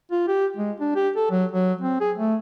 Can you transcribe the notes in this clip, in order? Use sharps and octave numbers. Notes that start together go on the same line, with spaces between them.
F4
G4
G#3
D4
G4
A4
F#3
F#3
C4
G#4
A3